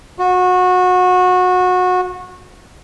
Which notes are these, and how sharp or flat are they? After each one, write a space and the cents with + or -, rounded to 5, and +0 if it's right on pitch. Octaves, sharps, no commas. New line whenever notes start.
F#4 -25